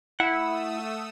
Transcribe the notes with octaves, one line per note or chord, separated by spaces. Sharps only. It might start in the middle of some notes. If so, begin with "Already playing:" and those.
A3 E4 F#5 D#6 E6